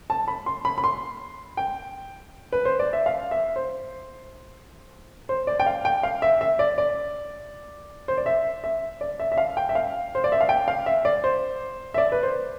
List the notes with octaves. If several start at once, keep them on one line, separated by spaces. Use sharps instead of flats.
A5
B5
C6
B5
B5
C6
G5
B4
C5
D5
E5
F5
E5
C5
C5
D5
G5
F5
G5
F5
E5
E5
D5
D5
C5
D5
E5
E5
D5
E5
E5
F5
G5
E5
F5
C5
D5
E5
F5
G5
F5
E5
D5
C5
E5
D5
B4
C5